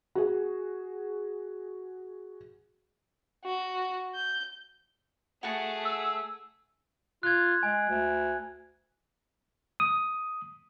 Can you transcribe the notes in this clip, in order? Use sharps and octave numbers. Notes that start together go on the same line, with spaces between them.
F#4 G#4
F#4
G6
A3 F#4 G#4 F#5 A5
E6
F4 F#6 G#6
G#3 G#5
D2
D#6